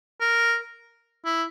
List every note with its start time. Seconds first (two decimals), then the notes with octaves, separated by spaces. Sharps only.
0.20 A#4
1.25 E4